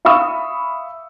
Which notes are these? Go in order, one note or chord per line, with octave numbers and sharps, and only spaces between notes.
E5 F5 B5 C#6 D#6 E6